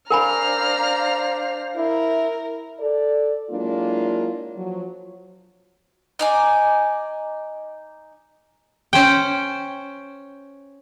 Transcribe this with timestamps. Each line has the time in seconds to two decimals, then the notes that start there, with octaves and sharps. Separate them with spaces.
0.10 D4 A#4 C5 F5 G#5 A#5 B5 F6
1.77 E4 A#4
2.80 A4 D5
3.50 F#3 G#3 A#3 D4 E4 F4
4.56 F3 F#3
6.19 D#4 D5 G#5
8.93 C#4 C5 G5